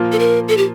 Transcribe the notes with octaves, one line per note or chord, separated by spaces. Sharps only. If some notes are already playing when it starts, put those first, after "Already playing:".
Already playing: A#2 F3 A#3 F4
A4
A#4
A4
G4